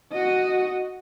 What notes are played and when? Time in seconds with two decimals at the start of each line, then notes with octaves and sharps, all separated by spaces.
0.13 F#4 D#5